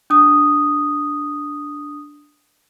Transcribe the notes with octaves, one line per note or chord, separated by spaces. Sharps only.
D4 D#6